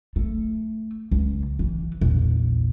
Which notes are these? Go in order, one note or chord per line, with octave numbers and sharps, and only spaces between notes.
A3
C#2
E3
A#1 E2